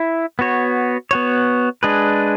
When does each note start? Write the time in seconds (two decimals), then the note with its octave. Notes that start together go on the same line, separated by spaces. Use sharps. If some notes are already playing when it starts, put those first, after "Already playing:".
Already playing: E4
0.39 B3 F#4 C#5
1.11 B3 F#4 C#5
1.83 G#3 D4 G#4 B4